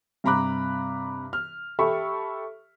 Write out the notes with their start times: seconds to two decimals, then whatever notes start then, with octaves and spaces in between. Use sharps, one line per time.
0.24 G2 C3 A#5 B5 D6 F#6
1.33 F6
1.79 G4 A4 E5 B5 C#6